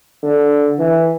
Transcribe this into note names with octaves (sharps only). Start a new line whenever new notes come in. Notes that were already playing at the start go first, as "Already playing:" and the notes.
D3
E3